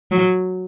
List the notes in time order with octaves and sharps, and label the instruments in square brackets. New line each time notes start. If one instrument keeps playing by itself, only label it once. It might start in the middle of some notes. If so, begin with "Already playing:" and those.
[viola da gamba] F#3